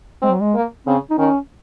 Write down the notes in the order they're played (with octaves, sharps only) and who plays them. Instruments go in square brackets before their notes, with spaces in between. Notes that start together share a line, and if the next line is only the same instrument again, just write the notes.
[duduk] G#3 [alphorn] C4
[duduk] F#3
G#3
[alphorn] A#3
[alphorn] C#3 [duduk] C4
[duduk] D#4
[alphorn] D#3 [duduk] C#4